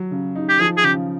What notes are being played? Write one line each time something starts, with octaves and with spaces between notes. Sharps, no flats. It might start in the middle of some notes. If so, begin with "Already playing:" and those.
Already playing: F#3
C#3
D#4
G4
F3 G#4
G#4
C#3 G4